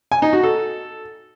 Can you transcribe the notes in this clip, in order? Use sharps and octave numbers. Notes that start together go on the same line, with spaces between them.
G#5
D#4
F#4
A4